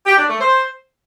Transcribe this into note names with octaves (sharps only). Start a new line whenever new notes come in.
G4
D4
A3
C5